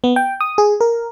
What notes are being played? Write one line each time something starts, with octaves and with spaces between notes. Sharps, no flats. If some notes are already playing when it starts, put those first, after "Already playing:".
B3
G5
D#6
G#4
A#4